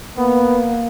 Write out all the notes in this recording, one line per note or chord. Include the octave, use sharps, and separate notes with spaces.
A#3 B3